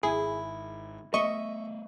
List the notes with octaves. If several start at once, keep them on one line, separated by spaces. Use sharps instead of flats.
G#1 E4 G#4
A3 B3 D#5 E5 C#6